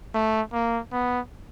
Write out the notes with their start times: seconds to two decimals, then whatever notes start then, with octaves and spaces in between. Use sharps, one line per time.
0.14 A3
0.53 A#3
0.92 B3